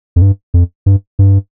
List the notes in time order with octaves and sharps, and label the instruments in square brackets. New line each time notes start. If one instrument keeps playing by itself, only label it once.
[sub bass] F2
G2
F2
G2
G2